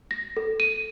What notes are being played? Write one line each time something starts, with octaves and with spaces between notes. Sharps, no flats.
A#6
A4
D#7